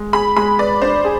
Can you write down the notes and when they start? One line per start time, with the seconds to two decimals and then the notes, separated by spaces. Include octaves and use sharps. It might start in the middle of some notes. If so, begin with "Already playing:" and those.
Already playing: G#3
0.13 G#4 B5
0.36 G#3 B5
0.59 B4 D5
0.82 D4 C5
1.04 G#4